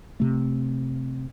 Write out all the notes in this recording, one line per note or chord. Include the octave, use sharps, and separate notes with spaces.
C3 A3